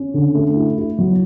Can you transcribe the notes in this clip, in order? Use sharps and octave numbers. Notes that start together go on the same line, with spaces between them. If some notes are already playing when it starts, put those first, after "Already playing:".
Already playing: C#4
D3
A3
E4
E4
F#3